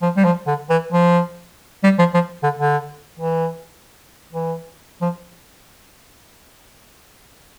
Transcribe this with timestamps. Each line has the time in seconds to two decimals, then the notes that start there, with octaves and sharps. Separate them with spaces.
0.02 F3
0.17 G3
0.25 F3
0.47 D3
0.70 E3
0.92 F3
1.84 G3
1.99 F3
2.14 F3
2.43 D3
2.59 D3
3.20 E3
4.33 E3
5.01 F3